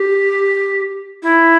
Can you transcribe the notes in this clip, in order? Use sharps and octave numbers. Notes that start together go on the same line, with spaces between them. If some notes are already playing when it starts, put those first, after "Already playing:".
Already playing: G4
E4